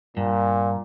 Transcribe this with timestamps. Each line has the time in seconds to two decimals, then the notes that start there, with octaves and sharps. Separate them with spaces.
0.17 G2 A#2